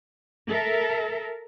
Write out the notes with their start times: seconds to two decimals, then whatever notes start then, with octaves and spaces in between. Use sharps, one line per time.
0.50 A4 A#4 E5